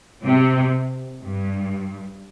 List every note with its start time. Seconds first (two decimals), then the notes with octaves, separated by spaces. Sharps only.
0.23 C3
1.22 G2